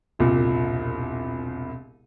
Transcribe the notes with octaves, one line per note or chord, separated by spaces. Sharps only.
E1 C2 A#2